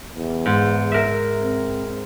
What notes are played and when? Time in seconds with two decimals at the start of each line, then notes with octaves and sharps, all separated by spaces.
0.14 E2
0.46 G#2
0.92 A#4 E5
1.42 C4